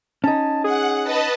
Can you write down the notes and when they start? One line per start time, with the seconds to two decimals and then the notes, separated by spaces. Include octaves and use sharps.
0.24 C#4 D#4 A5
0.64 G#4 F#5
1.03 B4 D#5 A5